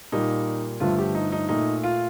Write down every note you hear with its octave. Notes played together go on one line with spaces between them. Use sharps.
A#2 G3 A#3 D#4
G2 D3 F3 A3 F4
G4
D#4
D#4
A#2 A3 D#4
F4